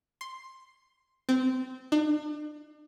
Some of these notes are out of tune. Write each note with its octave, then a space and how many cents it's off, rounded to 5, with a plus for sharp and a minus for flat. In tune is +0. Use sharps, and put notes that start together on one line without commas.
C6 +5
C4 -20
D4 +40